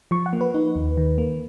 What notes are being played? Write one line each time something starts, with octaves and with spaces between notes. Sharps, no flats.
F3 C#6
F#5
A#3
B4
D#4
D#2
D#3
A#3